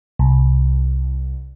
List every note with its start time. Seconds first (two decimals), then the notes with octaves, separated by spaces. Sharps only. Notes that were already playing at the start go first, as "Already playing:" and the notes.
0.19 C2